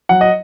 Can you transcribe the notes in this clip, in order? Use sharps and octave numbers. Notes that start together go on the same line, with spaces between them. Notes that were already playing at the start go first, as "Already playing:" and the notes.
F#3 F#5
D#5